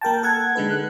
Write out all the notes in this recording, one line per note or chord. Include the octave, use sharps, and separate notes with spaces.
A#3 A#4 G5 A5
A4 F#5 A5 G#6
D3 G#3 D#4 B4
F#6